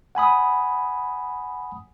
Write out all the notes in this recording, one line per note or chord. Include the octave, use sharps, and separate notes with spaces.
F#5 G#5 B5 D#6